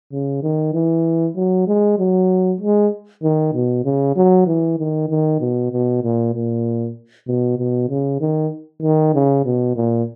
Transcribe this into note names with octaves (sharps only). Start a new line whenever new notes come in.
C#3
D#3
E3
F#3
G#3
F#3
G#3
D#3
B2
C#3
F#3
E3
D#3
D#3
B2
B2
A#2
A#2
B2
B2
C#3
D#3
D#3
C#3
B2
A#2